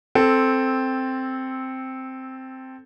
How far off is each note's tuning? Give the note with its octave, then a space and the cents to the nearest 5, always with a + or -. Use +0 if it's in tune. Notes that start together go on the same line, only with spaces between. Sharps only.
C4 +0 A4 +0